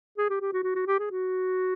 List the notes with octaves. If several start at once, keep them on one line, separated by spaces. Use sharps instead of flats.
G#4
G4
G4
F#4
F#4
F#4
G4
G#4
F#4